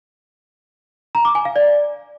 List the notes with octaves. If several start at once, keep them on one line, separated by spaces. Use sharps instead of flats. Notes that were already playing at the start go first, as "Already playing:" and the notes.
A#5
D6
G#5
F5
D5